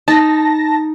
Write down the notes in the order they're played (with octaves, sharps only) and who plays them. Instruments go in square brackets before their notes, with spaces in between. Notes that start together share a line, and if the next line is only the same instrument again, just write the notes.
[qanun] D#4 [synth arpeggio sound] A5 A#6